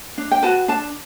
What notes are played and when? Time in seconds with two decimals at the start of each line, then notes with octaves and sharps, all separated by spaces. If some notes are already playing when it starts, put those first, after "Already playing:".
0.18 D4
0.31 G5
0.43 F#4 B4 A5
0.68 D4 A5